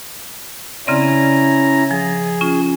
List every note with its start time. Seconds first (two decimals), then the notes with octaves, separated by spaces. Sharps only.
0.87 C#3 C4 C#4 E4 D5 A#5
1.91 F3 G#4
2.41 C#4 F4